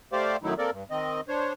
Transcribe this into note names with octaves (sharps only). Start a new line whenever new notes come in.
A3 G4 C5 D5 F5
F#2 D#3 F#3 A3 D#4 E4
A#3 C4 A4 A#4 D5
G2
D#3 C4 D#5
D4 C5 C#5